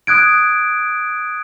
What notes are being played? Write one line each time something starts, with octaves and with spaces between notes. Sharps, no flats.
D#6 F#6 G#6 D7